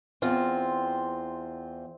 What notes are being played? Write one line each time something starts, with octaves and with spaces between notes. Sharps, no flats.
E2 C4 F4